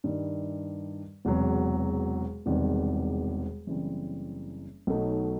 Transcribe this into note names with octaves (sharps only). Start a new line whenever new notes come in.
G2 D#3 G3
E1 E2 C3 F#3
E1 E2 C3 D#3 G3
F#1 F#2 E3 G3 C4
B1 B2 F#3 A3 D#4